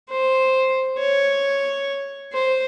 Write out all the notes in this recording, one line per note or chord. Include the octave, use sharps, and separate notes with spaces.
C5
C#5
C5